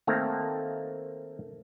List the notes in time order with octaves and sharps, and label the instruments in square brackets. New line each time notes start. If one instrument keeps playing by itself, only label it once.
[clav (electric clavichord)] D#3 A3 A#3 C4 A4 A#5